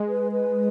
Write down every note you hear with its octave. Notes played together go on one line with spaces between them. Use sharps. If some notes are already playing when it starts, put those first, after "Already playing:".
Already playing: G#3
B4
B4